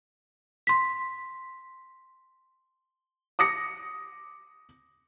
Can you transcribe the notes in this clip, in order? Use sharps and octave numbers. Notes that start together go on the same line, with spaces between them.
C6 B6
D6 D#6 A#6 C#7